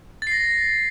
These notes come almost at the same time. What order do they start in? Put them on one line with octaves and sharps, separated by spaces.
A6 C7 A#6